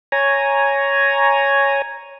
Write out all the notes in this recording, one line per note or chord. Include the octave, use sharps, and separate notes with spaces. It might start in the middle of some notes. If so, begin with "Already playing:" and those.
C#5 G#5 A#5